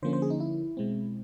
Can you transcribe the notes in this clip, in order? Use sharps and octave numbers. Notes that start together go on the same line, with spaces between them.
D3 F3 A#3 C#4 C5
C5
G#4
D#4
E4
B2 G#3 C4